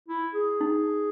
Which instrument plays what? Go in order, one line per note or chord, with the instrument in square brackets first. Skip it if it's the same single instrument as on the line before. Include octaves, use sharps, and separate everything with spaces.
[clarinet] E4
G#4
[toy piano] D#4